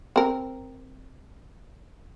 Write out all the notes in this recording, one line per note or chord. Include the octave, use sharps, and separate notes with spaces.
C4 A#4